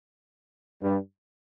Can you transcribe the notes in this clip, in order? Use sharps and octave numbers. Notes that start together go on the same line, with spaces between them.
G2 G3